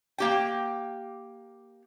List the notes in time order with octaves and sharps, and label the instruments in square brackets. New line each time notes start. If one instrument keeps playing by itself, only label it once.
[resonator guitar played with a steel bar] A#3 G4 G5